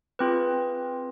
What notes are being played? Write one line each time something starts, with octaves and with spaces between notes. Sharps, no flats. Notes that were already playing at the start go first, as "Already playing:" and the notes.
C4 F4 G#4 B4